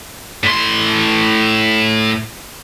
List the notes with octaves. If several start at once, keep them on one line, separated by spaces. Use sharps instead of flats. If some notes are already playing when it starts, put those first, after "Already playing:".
A2 C6